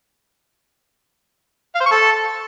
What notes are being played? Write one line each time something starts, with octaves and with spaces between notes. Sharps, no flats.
F5
C5
C#6
A4